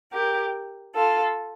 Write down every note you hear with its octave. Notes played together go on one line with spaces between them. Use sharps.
G4 A#4
F4 A4